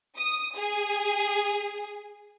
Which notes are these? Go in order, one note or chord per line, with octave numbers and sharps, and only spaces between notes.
D#6
G#4